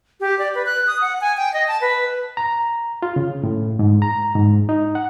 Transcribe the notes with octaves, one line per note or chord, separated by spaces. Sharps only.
G4
D5
B4
F#6
D#6
F#5
G#5
G5
D#5
A5
B4
A#5
F4
C#3
A2
G#2
A#5
G#2
D#4
F#5